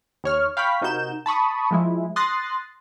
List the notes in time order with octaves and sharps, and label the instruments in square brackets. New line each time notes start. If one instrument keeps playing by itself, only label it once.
[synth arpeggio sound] D#2 C#5 F6
F5 G5 B5 C#6 B6
C3 D#4 F#4 A#4 G6 E7
A5 B5 C#6 D#6
F3 G#3 E4
C6 D#6 F#6 A6 A#6 C7